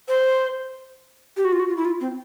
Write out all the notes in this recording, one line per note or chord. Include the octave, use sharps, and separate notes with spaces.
C5
G4
F#4
F4
F#4
F4
E4
F4
C4